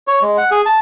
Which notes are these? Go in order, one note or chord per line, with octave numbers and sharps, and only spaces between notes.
C#5
G#3
F#5
G#4
A5